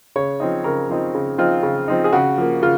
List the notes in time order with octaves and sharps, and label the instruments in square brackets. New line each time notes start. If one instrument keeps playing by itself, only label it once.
[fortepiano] C#3 C#5
F3 C4 D#4
C#3 A#4
F3 C4 D#4
C#3
F3 C4 D#4 F4
C#3
F3 C4 D#4
G#4
C#3 F#4
F3 A#3
C#3 F4